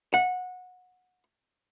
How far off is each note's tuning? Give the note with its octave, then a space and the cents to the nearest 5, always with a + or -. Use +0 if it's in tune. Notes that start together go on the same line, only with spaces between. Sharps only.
F#5 -20